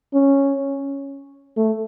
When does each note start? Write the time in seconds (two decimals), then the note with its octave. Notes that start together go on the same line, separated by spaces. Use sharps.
0.14 C#4
1.57 A3